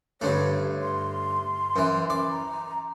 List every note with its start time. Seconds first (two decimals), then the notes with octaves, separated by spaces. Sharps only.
0.21 G2 D3 A3 C#5
0.81 C6
1.76 F#2 E3
2.10 D5
2.30 A#5